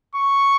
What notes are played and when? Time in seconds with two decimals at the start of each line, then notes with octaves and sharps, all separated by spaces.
0.15 C#6